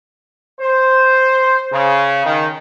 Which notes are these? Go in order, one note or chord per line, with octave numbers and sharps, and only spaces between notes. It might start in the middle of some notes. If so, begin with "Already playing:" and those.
C5
C#3
D#3